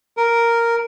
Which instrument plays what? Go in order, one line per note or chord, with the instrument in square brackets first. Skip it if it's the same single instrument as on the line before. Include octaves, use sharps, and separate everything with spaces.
[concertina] A#4